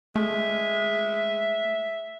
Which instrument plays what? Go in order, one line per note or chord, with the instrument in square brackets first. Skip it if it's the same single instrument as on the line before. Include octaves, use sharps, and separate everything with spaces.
[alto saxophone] G#3 [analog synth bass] A3 [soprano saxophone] E5